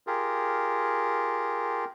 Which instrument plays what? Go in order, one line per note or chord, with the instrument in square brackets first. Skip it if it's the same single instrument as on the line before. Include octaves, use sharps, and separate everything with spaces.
[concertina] F4 G4 G#4 A#4